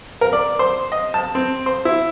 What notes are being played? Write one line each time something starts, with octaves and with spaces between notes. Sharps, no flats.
A#4
D5
C5
D#5
A5
C4
C5
E4